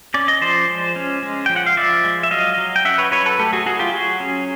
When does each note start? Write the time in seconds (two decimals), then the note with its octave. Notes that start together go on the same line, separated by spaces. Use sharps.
0.14 C#4 D5
0.28 D#5
0.41 F3 C5 D5
0.68 G#3
0.96 C#4
1.23 G#3
1.46 F3 G5
1.56 F#5
1.66 F5
1.77 F3 D5 E5
2.04 G#3
2.23 E5
2.31 F#3 D#5 F5
2.58 F#3
2.76 G5
2.85 C#4 E5 F#5
2.98 B4 C#5
3.12 F#3 B4 C#5
3.26 A4 B4
3.39 A3 G4 A4
3.53 F#4 G#4
3.66 F#3 F#4 G#4
3.79 F4 G4
3.93 F#3 F#4 G#4
4.20 C#4